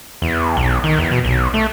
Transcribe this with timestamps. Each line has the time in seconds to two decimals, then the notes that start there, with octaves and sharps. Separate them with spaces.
0.22 E2
0.57 B1
0.84 D#3
0.99 E2
1.11 B2
1.25 B1
1.54 A3